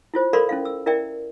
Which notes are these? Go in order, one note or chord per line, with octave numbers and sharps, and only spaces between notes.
E4 F4 C5
A4 A#4 D5 F5 B5 C6
C#4 E4 F5
E6
E4 A#4 D5 E5 G5